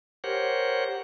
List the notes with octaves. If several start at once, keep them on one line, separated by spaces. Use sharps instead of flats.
G4 A#4 C5 C#5 F#5